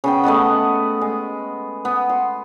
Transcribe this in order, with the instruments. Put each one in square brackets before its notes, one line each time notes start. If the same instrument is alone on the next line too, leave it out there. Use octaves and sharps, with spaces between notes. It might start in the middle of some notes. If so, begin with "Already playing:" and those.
[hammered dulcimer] C#3 B3 G5
A3 B3 D#5 F#5
G#3
B3
C6